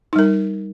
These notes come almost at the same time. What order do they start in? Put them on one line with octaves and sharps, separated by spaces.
D#4 G3 A#4